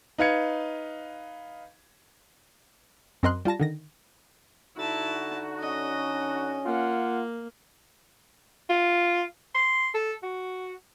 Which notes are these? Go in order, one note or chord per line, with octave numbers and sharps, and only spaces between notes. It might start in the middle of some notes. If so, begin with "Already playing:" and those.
D#4 B4 F5 G#6 C#7
F#2 C4 A#4 D#5 C6 F#6
G3 F4 A5 A#6
D3 D#3 A#6
D3 D#4 E4 F#4 A5
C#4 D#5
A#3 F4 F#5
F4
C6
A4
F#4